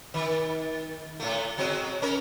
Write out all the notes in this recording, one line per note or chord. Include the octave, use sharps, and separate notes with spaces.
D#3
A2 A3
F#3 G#3 C4
C#4 A#4